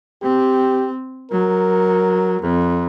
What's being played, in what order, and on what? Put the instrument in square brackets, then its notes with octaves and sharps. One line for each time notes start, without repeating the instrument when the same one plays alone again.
[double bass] C4 [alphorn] G4
[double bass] F#3 [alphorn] A#4
[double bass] F2